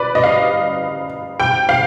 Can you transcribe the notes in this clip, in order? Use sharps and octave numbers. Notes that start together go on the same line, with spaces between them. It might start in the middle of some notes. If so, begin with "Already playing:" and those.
Already playing: B4 D5
D#5
F5
G5
F5